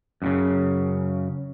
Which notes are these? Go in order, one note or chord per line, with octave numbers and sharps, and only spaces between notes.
F#2 A2 C#3